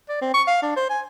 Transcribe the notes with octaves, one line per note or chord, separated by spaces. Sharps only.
D5
C4
C#6
F5
D4
C5
G#5